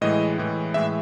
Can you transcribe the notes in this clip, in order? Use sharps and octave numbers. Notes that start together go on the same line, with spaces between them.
A2 E3 G#3 D#5
A2 E3 G#3
A2 E3 G#3 E5